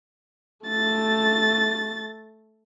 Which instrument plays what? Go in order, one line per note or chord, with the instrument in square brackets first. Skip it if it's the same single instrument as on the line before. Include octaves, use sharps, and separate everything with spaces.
[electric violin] A3 A6